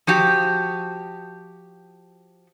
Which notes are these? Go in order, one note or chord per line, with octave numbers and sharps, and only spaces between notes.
F3 F#4 G4